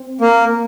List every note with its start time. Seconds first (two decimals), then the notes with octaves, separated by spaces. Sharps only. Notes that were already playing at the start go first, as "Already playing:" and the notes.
Already playing: C4
0.21 A#3